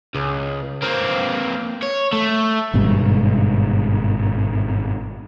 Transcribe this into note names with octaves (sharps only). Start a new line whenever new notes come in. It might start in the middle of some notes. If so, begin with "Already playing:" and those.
C#2
A#3 C4
C#5
A3
G#1 G2 B2 G#3